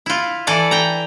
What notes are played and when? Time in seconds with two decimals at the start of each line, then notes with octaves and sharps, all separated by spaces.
0.06 E4 F4
0.47 E3 E4 A4 D5
0.71 G5 A#5